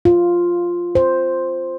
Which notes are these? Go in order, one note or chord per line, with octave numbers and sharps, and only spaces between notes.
F4
C5